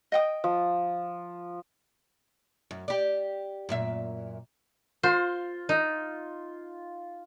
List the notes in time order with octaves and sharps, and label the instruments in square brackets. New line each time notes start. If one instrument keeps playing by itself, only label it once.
[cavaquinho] D#5 G5 D#6
[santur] F3
[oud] F#2
G4 D5
F#2 A#2 E5
[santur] F4 [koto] C5
[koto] D#4